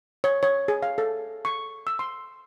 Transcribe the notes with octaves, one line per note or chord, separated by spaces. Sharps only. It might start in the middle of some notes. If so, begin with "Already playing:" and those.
C#5
C#5
G#4
F5
A4
C#6
E6
C6